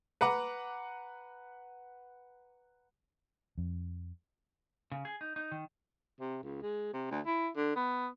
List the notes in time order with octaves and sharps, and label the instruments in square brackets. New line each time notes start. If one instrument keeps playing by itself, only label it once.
[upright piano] B4 F#5 A#5 D6
[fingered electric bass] F2
[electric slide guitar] C#3
G#4
D#4
D#4
D#3
[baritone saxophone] C3
C#2
G#3
C3
D2
E4
D3
B3